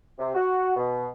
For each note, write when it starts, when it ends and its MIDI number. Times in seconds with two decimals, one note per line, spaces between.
0.18 0.31 48
0.35 0.76 66
0.76 1.07 47